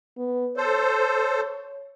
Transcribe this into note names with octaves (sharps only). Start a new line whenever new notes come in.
B3
A4 C5 C#5